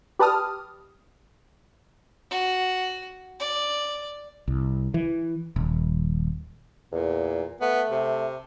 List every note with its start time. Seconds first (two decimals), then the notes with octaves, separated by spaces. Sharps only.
0.19 G4 B4 D5 A5 D#6 F6
2.31 F#4
3.40 D5
4.48 C2
4.94 E3
5.56 D#1
6.92 E2 A#2
7.61 A3 B3
7.91 C3